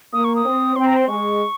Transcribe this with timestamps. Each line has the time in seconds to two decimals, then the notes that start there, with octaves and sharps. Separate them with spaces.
0.13 A#3 D#6
0.24 C#6
0.36 D#6
0.45 C4
0.76 C4 C6
0.86 A#5
0.97 C6
1.07 G#3 C#6